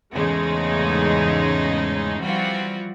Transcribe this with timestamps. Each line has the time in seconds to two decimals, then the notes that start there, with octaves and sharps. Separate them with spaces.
0.14 E2 G#2 C#3 G#3 A3 D#4
2.23 E3 F3 G3 C4 F4 F#4